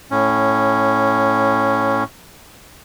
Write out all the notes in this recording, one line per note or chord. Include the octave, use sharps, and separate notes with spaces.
A2 C#4